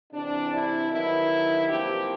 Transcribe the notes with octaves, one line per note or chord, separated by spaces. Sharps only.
E2 C3 E3 D4
E4
G2 D#3 F#3 B3 E4
C3 F3 A#3 G4